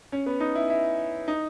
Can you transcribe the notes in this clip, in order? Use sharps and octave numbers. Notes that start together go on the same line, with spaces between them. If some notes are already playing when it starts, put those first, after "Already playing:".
C#4
B3
D#4
E4
E4
D#4